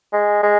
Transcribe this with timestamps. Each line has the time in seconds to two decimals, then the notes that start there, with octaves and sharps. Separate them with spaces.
0.13 G#3
0.43 G#3